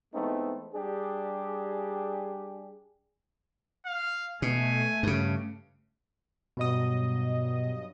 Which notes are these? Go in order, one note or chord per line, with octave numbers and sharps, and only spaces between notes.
E3 G#3 A3 B3 C4 D#4
G3 D4 G4 G#4
F5
B2 A3 G#5
G2 C#3
G2 B2 F#3 B3 D#5 D#6